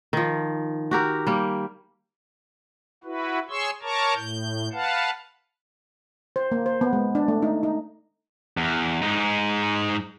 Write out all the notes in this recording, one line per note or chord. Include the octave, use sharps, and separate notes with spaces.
D#3 F3
F#4 G4 A#4
G3 A#3
E4 F#4 B4
G#4 C#5 C6 C#6 E6
A#4 C#5 A5 A#5 C#6 D6
A2 G6
B4 F5 F#5 A5
C5
A#3
C5
B3
G#3
D4
A3
D#4
D#4
E2
G#2 D#4